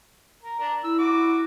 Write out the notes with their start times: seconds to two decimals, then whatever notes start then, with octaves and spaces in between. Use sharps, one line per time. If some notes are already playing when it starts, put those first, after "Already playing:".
0.43 A#4
0.59 D4 A#4
0.84 E4 E6
0.99 F#4 D6